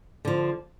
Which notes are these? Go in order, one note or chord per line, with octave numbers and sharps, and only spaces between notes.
D3 F3